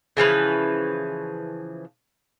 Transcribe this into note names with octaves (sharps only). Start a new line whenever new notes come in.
C#3 E3 F3 B4